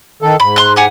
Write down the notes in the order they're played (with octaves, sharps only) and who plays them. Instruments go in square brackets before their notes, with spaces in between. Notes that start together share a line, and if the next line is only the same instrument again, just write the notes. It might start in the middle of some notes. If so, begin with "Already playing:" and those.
[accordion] D#3 A4
[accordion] G#2 [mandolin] B5
[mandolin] C6 F#6
G4 F#5 G#5